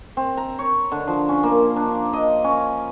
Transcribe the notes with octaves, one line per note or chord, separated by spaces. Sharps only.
C4
A#5
C#5
D3
F3
C#4
A#3
D4
D#5
C#4